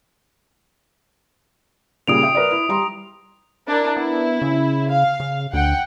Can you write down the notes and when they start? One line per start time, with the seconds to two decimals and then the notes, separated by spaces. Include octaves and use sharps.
2.07 A#2 C#3 G3 D#6 D7 F7
2.23 E5 G5
2.35 A#4 B4 D5
2.51 E4
2.69 G3 A#5 C6
3.67 D4 E4 A#4
3.97 B3 E4
4.42 C#3
4.90 F5
5.20 C#3
5.53 D2 F#5 G5